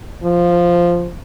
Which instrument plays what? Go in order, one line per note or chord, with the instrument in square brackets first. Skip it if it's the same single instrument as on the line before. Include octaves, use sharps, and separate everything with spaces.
[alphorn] F3